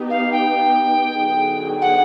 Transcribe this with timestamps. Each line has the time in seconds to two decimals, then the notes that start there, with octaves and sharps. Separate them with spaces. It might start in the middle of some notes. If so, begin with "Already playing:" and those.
Already playing: B3 D#4 G4
0.10 F5
0.32 G5
1.17 D3 F#3 B3 D#4 G#4
1.82 F#5